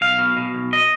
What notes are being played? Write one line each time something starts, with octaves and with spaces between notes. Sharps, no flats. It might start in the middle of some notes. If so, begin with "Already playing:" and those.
B1 F5
B2
B2
B1
D#5